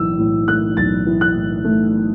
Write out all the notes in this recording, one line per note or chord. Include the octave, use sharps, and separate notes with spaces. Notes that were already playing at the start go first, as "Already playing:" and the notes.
Already playing: B1 A2 E3 E6
A2
A3 F#6
B1 A6
E3
F#6
A2
A3